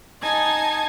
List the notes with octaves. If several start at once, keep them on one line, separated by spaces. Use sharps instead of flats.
D#4 G#5 A5 G#6